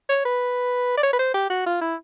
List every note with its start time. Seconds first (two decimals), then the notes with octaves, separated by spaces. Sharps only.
0.09 C#5
0.25 B4
0.97 D5
1.03 C#5
1.13 B4
1.19 C5
1.34 G4
1.50 F#4
1.66 F4
1.81 E4